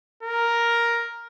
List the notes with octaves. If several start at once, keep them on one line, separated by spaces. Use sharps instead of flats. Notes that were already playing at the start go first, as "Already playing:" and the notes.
A#4